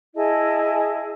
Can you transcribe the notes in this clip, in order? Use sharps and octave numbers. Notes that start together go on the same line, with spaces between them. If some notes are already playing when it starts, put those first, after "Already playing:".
E4 G#4 D#5 A5